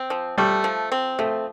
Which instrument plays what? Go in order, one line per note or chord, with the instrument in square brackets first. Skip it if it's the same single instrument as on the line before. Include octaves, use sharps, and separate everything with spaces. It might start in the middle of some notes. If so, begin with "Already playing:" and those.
Already playing: [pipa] C4
F3
[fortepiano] G3 [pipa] A3
[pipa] F3
C4
[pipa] F3 [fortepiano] A3